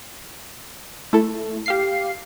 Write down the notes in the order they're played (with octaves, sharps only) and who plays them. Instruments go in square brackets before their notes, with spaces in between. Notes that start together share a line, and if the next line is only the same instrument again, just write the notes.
[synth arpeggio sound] A3 [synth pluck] E4 A4
[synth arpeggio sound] G4 F5 C7